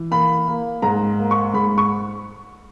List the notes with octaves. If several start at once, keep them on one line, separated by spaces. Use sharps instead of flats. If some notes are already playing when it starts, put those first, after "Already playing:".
Already playing: E3
A#3 B5
A#3
G#2 A#5
A#3
C#6
G#2 B5
C#6